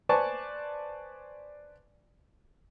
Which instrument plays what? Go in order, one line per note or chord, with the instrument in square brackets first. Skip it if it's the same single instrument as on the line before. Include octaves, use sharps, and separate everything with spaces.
[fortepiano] B4 C5 D5 G#5 A5 C#6